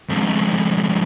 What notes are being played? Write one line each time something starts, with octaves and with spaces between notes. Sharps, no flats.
F2 G#2